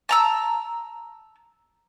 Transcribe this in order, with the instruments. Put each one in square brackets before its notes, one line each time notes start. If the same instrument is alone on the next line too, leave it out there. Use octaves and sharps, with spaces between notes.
[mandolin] A5 A#5 E6